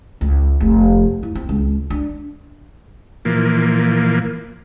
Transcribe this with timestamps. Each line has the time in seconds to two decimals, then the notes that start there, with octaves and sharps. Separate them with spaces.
0.21 C#2
0.60 F1
1.23 E4
1.35 C4
1.49 C#2
1.90 D4
3.25 A#2 E3 F3 A#3